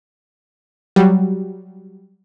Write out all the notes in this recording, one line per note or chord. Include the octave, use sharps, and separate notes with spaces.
F#3 G3